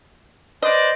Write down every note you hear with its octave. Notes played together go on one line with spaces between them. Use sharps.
B4 C5 D5 D#5